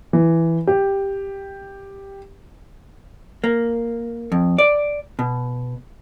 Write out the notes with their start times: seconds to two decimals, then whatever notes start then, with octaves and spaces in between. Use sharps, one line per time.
0.13 E3
0.67 G4
3.44 A#3
4.32 F2
4.58 D5
5.19 B2